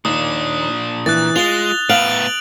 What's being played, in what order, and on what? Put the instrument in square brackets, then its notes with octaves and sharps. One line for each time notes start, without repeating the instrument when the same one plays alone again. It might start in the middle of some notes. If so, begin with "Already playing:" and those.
[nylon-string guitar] D#2 [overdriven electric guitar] A#2 D4 [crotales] D#6
[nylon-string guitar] E3 [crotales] F#6 A6
[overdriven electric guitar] G#3 [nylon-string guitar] F4 [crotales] F7 G7
[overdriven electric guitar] A2 B3 [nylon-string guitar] F5 [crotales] D7 F7 F#7